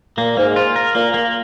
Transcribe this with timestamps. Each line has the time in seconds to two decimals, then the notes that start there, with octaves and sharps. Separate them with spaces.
0.17 A#2 A#3
0.37 G#2 A#3
0.56 F4
0.76 A#4
0.95 A#2 A#3
1.14 A#3